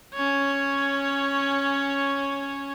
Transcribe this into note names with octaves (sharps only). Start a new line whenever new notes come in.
C#4 C#5